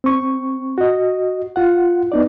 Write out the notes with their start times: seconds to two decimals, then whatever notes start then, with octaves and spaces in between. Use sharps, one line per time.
0.04 C4 C#6
0.78 F#4 D#5
1.56 F4 F#5
2.12 B3 D#4 D5